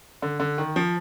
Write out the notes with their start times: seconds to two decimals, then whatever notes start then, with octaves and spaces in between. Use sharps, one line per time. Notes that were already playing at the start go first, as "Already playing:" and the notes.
0.22 D3
0.40 D3
0.58 D#3
0.76 F3